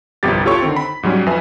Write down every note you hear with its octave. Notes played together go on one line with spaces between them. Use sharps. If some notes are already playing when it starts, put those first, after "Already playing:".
G1 C2 F2 B3 G4 A6
F4 G4 A4 C#5 C#6
D3 D#3 C4
B5
G#2 F#3 G3 C#4
F2 B4 E5 G#5